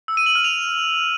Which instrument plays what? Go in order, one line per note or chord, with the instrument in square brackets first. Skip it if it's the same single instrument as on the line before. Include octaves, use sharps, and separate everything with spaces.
[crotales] E6
D#7
F#7
F6
F7